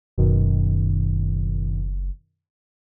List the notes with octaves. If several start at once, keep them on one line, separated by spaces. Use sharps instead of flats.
F#1 F#2 B2 D#3